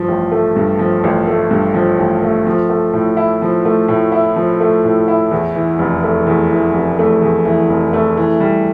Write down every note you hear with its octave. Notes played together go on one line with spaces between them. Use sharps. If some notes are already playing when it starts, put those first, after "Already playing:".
Already playing: G2 F3
A1
A3
G2
F3
A1
A3
G2
F3
A1
A3
F3
A3
A2
E4
F3
A3
A2
E4
F3
A3
A2
E4
E2
E3
F1
A3
E2
E3
F1
A3
E2
E3
F1
A3
E3
G3